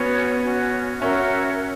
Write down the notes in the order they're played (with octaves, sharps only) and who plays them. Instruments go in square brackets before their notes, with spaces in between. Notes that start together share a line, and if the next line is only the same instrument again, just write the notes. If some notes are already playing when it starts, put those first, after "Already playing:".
Already playing: [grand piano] B3 [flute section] C#4 F#4 C#5
[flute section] C#4 F#4 C#5
[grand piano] C#4 [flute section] F#4 A#4 C#5 E5